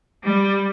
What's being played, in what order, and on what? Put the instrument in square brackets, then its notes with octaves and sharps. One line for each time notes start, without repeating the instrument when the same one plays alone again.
[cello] G3